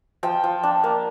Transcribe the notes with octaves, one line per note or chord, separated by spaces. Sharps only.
F3 G5
F3
D4
A#3